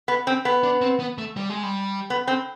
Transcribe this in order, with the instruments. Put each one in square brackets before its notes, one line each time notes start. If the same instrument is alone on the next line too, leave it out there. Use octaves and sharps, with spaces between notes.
[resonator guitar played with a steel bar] B3
C4
B3
[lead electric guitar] D4
C4
B3
A3
G3
G#3
G3
[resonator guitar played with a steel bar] B3
C4